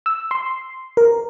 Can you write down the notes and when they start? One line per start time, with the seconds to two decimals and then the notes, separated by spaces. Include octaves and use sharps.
0.06 E6
0.31 C6
0.97 A#4